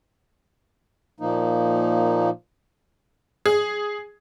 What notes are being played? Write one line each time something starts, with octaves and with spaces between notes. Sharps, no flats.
A#2 F3 A#3 D#4
G#4